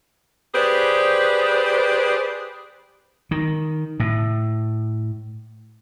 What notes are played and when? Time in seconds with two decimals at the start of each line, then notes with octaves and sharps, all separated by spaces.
0.55 G4 G#4 B4 C5 D5
3.31 D#3
4.00 A2